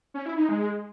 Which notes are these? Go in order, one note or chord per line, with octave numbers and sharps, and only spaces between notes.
C#4
E4
D#4
G#3